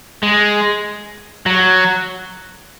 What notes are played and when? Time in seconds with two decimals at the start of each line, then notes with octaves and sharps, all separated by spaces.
0.23 G#3
1.46 F#3